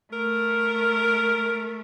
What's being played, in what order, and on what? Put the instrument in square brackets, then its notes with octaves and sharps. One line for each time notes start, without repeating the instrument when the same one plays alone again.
[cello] A3 [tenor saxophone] A#4